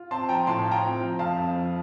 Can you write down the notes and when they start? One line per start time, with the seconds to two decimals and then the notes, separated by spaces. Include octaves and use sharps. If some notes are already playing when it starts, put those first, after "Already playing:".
Already playing: F4
0.11 C4 A5 C6
0.29 F3 G5 A#5
0.47 A2 A5 C6
0.65 F4
0.71 G5 A#5
0.83 C4
1.01 F3
1.19 F2 F5 A5
1.37 F2
1.55 F3